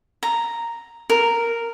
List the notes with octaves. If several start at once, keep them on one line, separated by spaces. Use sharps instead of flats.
A#5
A#4